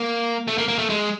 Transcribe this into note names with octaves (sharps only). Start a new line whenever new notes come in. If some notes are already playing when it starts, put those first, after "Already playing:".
Already playing: A#3
A3
A#3
A#3
A3
G#3